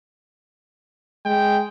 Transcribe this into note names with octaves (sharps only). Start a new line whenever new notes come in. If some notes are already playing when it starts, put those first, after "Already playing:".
G#3 G5